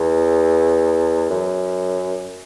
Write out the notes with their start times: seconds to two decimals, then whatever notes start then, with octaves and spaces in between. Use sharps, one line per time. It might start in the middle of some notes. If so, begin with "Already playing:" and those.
Already playing: E2
1.30 F#2